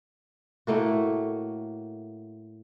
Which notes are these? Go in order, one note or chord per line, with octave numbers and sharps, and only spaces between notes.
A2 A3 A#3 F#4